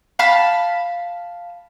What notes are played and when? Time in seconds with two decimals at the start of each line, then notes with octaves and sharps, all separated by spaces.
0.19 F5 A5 B5 F6